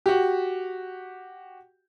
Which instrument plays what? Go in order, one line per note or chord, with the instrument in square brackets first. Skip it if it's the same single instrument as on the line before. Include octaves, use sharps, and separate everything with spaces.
[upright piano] F#4 G4